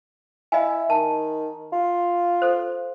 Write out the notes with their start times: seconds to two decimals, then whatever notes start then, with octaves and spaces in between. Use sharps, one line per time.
0.52 E4 D#5 F5 G#5
0.90 D#3 A5
1.72 F4
2.42 A4 C5